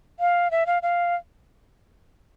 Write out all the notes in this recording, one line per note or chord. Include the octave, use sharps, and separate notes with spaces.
F5
E5
F5
F5